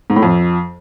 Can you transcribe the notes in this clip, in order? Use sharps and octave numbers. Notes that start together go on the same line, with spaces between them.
G#2
A2
F2